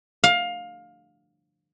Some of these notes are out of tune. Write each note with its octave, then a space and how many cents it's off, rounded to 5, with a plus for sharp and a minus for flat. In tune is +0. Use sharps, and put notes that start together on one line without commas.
F5 +20